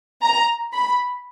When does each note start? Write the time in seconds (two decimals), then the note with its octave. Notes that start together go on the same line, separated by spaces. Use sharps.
0.22 A#5
0.73 B5